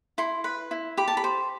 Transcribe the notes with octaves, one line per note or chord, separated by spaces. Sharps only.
E4 C6
B4 B5
E4
G4 B5
A5
B5
C5